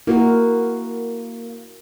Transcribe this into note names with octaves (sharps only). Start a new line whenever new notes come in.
A#3 E4 F#4 A#4